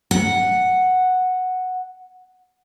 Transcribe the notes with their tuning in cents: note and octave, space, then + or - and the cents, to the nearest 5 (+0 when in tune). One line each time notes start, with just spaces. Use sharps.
F#5 -5